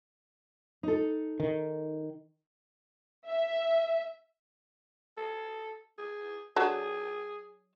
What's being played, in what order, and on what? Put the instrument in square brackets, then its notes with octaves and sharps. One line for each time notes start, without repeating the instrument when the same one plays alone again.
[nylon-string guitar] D#4 A4
[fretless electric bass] D#3
[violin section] E5
[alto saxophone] A4
G#4
[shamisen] F#3 D4 A4 [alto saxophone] G#4